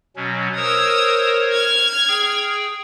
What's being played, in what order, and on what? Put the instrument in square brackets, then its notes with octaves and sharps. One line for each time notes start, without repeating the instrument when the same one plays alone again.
[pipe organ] B2 F#3 C#4
[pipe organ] A#4 C5 C#5 [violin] D#6 E6
[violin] F6 G#6
[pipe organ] G#4 G5